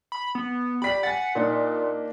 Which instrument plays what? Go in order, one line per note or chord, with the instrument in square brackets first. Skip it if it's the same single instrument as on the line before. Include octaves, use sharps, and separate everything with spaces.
[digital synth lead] B5
B3
[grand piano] G4 D5 B6 [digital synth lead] B5
[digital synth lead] F#5 [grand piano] G#5 A6
[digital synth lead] A#2 [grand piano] A#3 D4 D#4